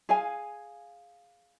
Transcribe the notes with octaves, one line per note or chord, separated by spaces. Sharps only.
G#4 F5 G#5